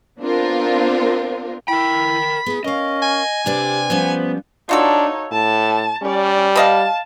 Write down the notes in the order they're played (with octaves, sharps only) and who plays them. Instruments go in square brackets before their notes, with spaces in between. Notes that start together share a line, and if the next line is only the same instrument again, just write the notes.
[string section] B3 C4 D4 F4 A#4
[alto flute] E4 [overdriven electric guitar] A#4 G5 [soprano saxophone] B5
[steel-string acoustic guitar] B3 E4 [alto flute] G#4
[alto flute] C#4 [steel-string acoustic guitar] A#4 F5 [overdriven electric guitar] D#5
[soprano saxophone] G#5
[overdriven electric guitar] C3 [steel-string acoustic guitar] D4 B4 D5 [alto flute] G4
[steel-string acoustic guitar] F3 G3 C#4 [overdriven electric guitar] B3 [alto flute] C5
[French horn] D4 [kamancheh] D#4 C#5 [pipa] F4 F#4 A4
[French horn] A2 [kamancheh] A5
[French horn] G3 [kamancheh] C#4 D5
[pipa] B4 D#5 F5 [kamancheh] A5